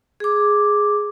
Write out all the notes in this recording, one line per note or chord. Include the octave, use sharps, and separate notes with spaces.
G#4 D6